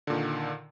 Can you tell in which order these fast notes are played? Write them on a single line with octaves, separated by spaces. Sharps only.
D3 A#2 D#3